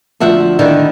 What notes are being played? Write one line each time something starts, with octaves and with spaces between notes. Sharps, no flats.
D2 F3 E5 F#5
D3 D#3 D#4 E4